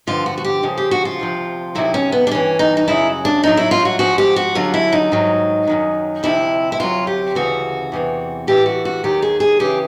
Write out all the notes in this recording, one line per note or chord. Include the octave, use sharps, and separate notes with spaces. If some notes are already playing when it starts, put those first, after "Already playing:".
G2 D3 F3 F4
F#4
F#4
G4
F2 C#3 F3
G4
F#4
F4
D2 C3 F3
D2 C3 D#3 F#3 E4
C#4
B3
D4
G2 E3 C#4
D#4
D#4
F#2 C#3 F#3 E4
D4
A2 F#3 D#4
E4
F4
F#4
G#2 F3 F#4
G4
F#4
F#2 D3 F#3 F4
E4
D#4
G#2 D#3 F#3
F#2 D#3 F#3
D2 C3 F3 E4
E4
D2 C3 D#3 F#3 F4
G4
D2 C#3 E3 F#4
E2 C3 E3
A2 E3 G4
F#4
F#4
D#2 D#3 F#3 G4
G#4
G#4
F#2 C#3 E3 G4